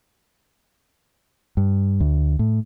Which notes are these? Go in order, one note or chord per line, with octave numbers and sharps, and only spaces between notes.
G2
D2
A2